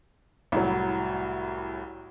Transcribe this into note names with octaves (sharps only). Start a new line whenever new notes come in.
C2 A2 F#3